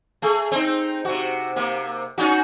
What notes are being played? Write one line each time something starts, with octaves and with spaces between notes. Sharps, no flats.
A3 G#4
C4 D#4
C3 F#4
C3 A#3
C#4 D#4 F#4